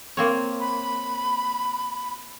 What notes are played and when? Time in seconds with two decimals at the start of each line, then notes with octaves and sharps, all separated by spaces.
0.17 A#3 C4 C#5
0.60 B5